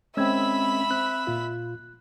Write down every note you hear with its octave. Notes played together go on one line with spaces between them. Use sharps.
G#3 C4 C#4 E5 B5 E6 G#6
C4 F#6
A#2 F4